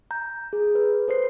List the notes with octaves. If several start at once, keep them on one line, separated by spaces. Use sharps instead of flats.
A#5 G6
G#4
B4
A4 B4 C5 C7